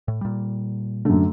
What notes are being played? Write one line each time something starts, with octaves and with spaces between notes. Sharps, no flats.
A2
A#2 G3
F#2 D3 A3